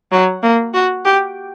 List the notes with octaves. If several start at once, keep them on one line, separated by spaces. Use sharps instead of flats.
F#3
A#3
F#4
G4